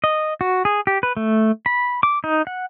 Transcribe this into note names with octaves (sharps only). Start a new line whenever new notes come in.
D#5
F#4
G#4
G4
B4
A3
B5
D6
D#4
F#5